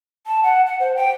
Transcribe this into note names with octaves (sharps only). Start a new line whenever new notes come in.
A5
F#5
F#5
C5
G5